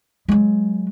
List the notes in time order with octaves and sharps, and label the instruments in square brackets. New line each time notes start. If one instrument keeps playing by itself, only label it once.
[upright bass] F#3 G#3